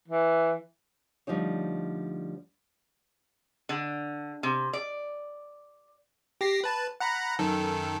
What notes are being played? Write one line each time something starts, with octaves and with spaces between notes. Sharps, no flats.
E3
D2 F3 G3 D#4 C#5
D3
C3
D5
G4 A#6 C7
B4 A5
F#5 A#5 B5
F#2 D#3 A4